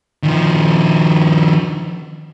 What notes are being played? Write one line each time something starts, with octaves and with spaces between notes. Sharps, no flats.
D#3 F3